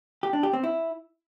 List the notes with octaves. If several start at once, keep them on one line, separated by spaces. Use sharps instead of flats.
G4
D4
G4
C4
E4